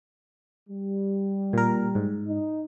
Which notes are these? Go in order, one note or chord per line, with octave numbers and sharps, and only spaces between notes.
G3
A#2 A#4
G#2
D#4